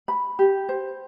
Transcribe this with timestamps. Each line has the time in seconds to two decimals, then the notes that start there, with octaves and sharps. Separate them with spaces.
0.08 B5
0.39 G4
0.69 C5